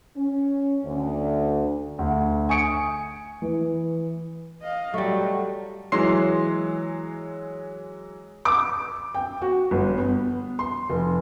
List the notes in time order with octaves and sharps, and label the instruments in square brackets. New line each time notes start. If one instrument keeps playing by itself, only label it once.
[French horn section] C#4
D2
[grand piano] D2
G#5 C#6 D#6 C#7 D7
E3
[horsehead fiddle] D#5 F5
[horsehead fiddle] F#3 [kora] G3 A3
[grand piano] E3 F#3 G#3 C6 C7
[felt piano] D6
G5
F#4
G1
B3
C6
F1